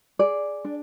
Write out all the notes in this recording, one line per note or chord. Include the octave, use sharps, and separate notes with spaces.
G#4 D5
D4